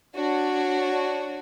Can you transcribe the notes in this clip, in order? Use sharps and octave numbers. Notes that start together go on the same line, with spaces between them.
D4 F#4 C#5